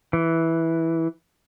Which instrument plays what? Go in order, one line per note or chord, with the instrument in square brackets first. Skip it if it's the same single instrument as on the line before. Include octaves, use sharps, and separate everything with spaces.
[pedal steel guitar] E3